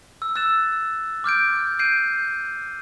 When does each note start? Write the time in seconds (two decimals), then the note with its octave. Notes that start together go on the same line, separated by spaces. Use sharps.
0.22 E6
0.36 E6 F#6 A6 E7
1.24 D6 F6 G6 D7
1.79 G6 C7 D7 D#7